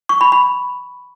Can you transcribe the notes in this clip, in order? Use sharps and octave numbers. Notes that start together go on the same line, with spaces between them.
C#6
B5
B5